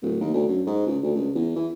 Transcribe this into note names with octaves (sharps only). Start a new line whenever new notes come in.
D1
D#2
D2
F#2
G#2
C#2
D2
C#2
E2
E3